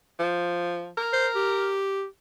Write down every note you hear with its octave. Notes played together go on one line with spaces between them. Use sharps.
F3
A#4
C5
G4